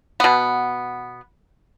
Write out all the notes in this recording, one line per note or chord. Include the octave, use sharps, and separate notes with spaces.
B2 B3